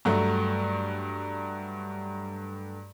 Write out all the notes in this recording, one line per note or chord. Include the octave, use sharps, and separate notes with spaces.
G2 F#3 A3